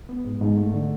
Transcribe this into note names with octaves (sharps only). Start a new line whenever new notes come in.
B3
G#2
G#2
A3
D3